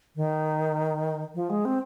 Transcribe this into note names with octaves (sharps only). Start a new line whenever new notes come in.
D#3
F3
G#3
C4